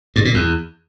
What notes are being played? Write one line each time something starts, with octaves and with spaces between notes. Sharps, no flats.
G2
A#2
E2